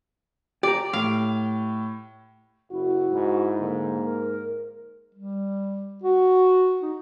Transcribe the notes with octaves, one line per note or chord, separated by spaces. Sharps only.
G4 D5 A#5
A2 F5
F#1 E4 F#4
G#2
D3 A#3
A#4
G3
F#4
D#4